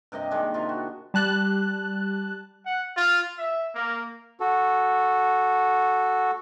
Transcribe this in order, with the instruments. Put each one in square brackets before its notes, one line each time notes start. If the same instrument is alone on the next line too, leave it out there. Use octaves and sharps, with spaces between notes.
[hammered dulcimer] G2 C3 A#3 D#5
D#3 G#3 D4
C3 F4
F#4
[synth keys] G3 A5 F#6
[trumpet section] F#5
F4
E5
A#3
[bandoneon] F#4 A4